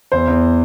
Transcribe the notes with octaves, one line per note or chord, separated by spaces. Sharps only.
E2 C5
E2